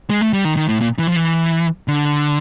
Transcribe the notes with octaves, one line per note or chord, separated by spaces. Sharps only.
G#3
A3
G3
D#3
D#3
A2
A#2
E3
F3
E3
D3